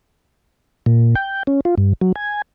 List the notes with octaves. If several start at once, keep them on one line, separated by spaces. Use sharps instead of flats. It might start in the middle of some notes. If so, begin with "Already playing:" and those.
A#2
G5
C#4
F4
G2
F#3
G#5